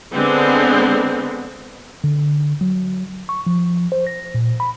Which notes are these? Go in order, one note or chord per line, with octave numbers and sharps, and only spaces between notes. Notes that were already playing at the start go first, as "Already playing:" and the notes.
D3 G#3 B3 C4
D3
F#3
C#6
F3
C5
A#6
A#2
B5